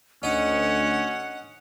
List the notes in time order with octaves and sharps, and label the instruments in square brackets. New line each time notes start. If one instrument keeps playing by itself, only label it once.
[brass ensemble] D2 [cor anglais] C#4 [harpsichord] D#4 [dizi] F#5